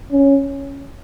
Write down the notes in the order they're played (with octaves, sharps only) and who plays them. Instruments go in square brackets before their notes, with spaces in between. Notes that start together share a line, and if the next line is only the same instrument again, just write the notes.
[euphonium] C#4